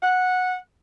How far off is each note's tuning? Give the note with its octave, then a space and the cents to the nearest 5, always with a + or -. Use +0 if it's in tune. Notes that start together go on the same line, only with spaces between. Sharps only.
F#5 -10